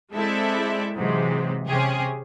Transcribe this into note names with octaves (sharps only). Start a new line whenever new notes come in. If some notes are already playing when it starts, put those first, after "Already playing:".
G#3 C4 E4 A4 D5 E5
G#2 C3 E3 F#3 G#3
C3 C#4 G4 G#4